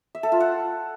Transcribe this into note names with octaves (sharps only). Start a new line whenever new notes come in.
E5
A4
F4
F#5